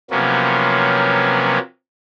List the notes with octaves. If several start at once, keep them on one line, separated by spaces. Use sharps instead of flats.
C3 F3 F#3 A#3 B3 C#4